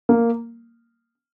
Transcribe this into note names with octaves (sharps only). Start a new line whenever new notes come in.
A#3